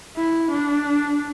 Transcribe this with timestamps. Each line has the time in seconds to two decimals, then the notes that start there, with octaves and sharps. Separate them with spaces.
0.16 E4
0.51 D4